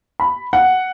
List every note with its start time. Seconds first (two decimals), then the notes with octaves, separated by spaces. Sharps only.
0.20 B5
0.53 F#5